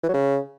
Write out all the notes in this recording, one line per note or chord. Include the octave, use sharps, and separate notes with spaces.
E3
F#3
C#3